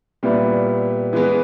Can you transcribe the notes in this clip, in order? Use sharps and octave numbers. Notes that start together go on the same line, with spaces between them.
A#2 G3 B3 E4
E3 G#3 B3